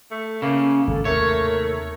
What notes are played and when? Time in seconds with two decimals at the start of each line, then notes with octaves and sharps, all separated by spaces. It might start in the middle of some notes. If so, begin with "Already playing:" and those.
0.11 A3
0.42 C#3 A#3
0.87 G#1 A4
1.05 D#2 C3 A3 A#4 C#5